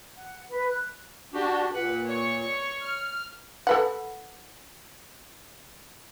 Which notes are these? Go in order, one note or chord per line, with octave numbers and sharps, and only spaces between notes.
F#5
B4
F#6
D4 F#4 G4
A#2 B4 F#5
C#5 C#6
F6
A4 B4 F#5